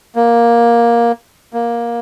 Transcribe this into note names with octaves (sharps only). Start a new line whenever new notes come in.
A#3
A#3